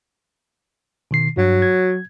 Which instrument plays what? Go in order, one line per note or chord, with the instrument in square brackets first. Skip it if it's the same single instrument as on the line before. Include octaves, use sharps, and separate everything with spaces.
[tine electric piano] B2 D#3 C7
[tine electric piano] G2 [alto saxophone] F#3
[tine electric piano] G#6